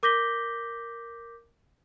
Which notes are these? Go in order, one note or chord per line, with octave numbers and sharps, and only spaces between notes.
A#4 D6 G6 A#6 B6 G7